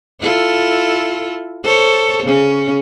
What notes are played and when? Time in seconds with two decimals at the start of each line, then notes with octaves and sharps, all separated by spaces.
0.21 E4 F4 A4
1.63 A4 C5 C#5
2.23 C#3 C#4